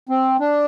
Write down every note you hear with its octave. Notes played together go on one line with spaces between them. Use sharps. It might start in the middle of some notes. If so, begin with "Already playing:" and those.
C4
D4